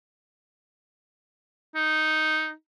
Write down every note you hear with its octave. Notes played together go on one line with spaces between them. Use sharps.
D#4